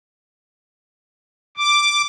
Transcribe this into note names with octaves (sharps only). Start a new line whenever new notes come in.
D6